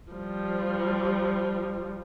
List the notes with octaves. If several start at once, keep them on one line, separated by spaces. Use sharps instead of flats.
F3 G3